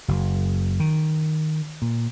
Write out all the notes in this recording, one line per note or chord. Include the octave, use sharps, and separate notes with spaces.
F#1
D#3
A#2